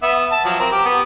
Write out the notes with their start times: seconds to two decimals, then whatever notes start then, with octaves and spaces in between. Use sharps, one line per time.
0.03 B3 E5
0.31 A5
0.45 F3 F#3
0.60 C4 A#4
0.72 G4
0.85 B3